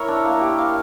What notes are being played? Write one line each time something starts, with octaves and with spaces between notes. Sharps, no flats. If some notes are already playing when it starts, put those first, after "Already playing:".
Already playing: E4 A#4 C#5 E5
D4
A#3
G4
F5